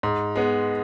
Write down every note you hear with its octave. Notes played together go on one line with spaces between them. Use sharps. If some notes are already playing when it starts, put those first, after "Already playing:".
G#2
G#3 B3